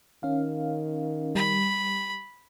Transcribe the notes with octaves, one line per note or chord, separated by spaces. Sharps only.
D#3 C#4 F5
G3 B5